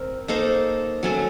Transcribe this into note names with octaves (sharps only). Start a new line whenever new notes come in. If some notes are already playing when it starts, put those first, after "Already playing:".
Already playing: C4 A#4
A#3 D#4 A4 C5
F#3 A3 C#4 A4